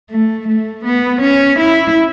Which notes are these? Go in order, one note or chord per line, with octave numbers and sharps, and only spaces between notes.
A3
A3
B3
C#4
E4